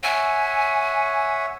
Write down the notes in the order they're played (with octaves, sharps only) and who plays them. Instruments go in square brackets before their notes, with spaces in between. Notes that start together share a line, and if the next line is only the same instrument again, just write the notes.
[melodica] C#5 E5 F#5 [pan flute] G#5